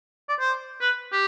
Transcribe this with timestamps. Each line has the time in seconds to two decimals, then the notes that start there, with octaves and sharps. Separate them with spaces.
0.29 D5
0.40 C5
0.81 B4
1.12 G4